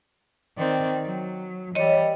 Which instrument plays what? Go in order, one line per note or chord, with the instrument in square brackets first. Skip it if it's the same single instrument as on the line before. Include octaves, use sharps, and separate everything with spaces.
[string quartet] D#3 C4 D5
F#3
[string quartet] E3 G3 [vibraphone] C#5 D#5